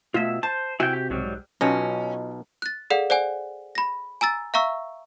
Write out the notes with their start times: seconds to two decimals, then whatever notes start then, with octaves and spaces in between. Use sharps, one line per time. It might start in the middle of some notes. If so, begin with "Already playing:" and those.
0.14 B2 A3 F4 E5
0.43 C5 A5
0.80 C3 E4 F#4 G5 G#5
0.93 G4
1.10 B1 G#2 F#3 G3
1.61 B1 B2 C#4 F4 C#5 D#5
2.62 F#6 A6
2.90 G#4 A4 D5 F5 F#5
3.10 C5 D5 F#5 G#5
3.75 B5 A#6
4.21 G#5 A#5 E6 A6
4.54 E5 F5 A#5 C#6 E6